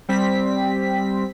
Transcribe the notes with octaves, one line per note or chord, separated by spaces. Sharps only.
G3 C4 B6